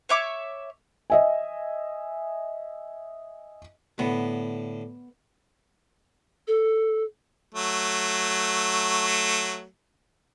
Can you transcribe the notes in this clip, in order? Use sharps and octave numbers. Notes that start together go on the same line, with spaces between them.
C#5 E5 D6
D#5 E5 G#5
A2 D3 B3
A4
F#3 A3